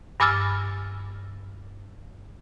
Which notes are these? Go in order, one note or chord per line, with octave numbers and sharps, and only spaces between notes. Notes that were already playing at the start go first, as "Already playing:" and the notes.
G2 G#5 D6 E6 F6 A6